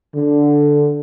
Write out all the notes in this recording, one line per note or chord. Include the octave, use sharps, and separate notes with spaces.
D3